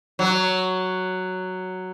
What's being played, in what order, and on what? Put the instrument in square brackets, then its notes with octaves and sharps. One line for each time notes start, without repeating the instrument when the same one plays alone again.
[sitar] F#3